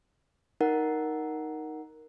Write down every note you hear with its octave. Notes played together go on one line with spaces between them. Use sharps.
D#4 A#4 F#5